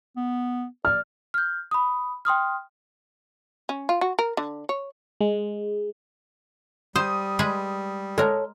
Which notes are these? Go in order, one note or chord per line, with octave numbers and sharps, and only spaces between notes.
B3
D5 F6
F6 G6
B5 D#6
G5 C6 D#6 F6
C#4
F4
F#4
A#4
D3
C#5
G#3
G3 C5 D#6
G#3 G#4 B4
G#3 A4 A#4 C#5 A5